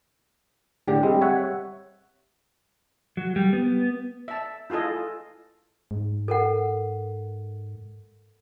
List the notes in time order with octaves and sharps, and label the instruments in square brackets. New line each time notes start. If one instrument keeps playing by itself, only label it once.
[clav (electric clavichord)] A2 D3 [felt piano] G4
[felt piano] G3 C4 [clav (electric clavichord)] G#3
[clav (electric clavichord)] C#5 E5 F#5
[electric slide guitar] F#3
G3
B3
[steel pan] E5 A5
E4 F4 G#4 A4 D#5
[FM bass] G#2
[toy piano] A4 A#4 F#5